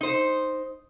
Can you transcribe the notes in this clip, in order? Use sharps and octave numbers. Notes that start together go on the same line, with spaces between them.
D#4 C5